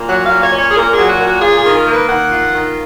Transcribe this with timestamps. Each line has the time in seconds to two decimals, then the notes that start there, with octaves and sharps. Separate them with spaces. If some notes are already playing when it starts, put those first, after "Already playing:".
Already playing: A#2
0.09 F#3 F#5
0.26 A#2 F5
0.43 C#5
0.53 C#4
0.59 C#5
0.71 G#4
0.75 A#2 A#4
0.92 F#3 G#4
1.09 F#4
1.20 A#2
1.26 F#4
1.41 F4 G#4
1.59 G#4
1.64 D#3
1.75 A#4
1.86 A#3
1.92 B4
2.08 D#3 F#5
2.31 F4
2.53 D#3